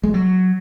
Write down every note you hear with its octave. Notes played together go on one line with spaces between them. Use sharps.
G#3
F#3